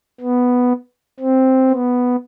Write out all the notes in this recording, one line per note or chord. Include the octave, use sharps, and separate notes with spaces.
B3
C4
B3